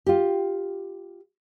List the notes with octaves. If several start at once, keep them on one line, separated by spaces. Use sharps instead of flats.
F4 G4